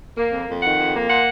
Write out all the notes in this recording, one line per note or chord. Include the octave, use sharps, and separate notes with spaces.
A#3
F2
F2
D#3 F#5
F2
A#3
A#2 F#5